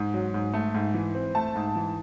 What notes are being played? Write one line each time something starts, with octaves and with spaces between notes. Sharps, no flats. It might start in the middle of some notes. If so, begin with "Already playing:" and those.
Already playing: G#2
F#3
G#2
A3
G#2
E3
C4
A3 A5
G#2
E3